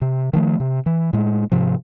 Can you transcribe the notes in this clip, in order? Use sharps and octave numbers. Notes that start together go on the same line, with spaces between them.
C3
D#3 F3 A3
C3
E3
A2 G#3
G#2 C3 F3